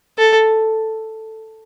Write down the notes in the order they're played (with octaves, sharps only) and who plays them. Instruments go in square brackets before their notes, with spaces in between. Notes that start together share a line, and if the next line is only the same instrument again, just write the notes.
[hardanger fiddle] A4